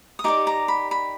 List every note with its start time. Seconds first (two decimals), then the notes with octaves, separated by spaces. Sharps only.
0.19 D#6
0.24 D#4 G4 A#4 D5 D6
0.47 A#5
0.68 B5
0.91 B5